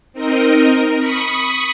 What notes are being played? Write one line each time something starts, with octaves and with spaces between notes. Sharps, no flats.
C4 D#4 A#4 D#5
A#4
B5 C#6 D#6